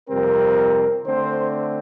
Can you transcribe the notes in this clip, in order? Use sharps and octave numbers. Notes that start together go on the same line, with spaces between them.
F2 C3 G3 C4 A#4
D3 A3 C4 C5